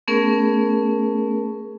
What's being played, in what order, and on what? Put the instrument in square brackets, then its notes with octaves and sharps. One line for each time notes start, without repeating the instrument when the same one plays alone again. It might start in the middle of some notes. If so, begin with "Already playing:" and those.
[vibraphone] A3 B3 C#4 G#4 A#4